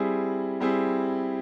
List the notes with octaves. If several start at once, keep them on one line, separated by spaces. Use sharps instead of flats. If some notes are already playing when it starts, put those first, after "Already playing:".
Already playing: G3 C4 E4 G#4
G3 C4 E4 G#4